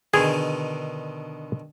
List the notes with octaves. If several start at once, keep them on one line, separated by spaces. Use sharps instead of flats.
B2 D3 D#3 G#4